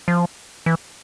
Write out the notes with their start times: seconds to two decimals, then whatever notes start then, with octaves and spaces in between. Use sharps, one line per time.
0.08 F3
0.66 E3